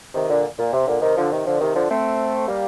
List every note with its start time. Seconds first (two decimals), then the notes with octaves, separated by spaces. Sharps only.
0.14 C3 D#3
0.30 A#2 D3
0.59 A#2
0.73 C3
0.87 A#2 D3
1.02 C3 D#3
1.17 D3 F3
1.31 C3 D#3
1.45 D3 F3
1.61 C3 D#3
1.75 D3 F3
1.90 A3 C4
2.48 G3 A#3